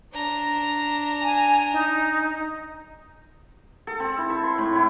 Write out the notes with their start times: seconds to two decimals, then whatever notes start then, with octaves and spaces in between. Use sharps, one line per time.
0.13 D4 A#5
1.22 G#5
1.73 D#4
3.87 A4
4.00 C4
4.18 E4
4.30 E5
4.43 C6
4.58 A2
4.75 E4